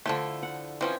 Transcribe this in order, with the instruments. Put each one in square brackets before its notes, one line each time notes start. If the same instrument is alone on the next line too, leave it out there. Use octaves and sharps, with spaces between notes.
[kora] D3 E4 [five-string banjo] F3 F#3 A3
[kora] F#5
[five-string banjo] E3 F3 C#4 [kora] C4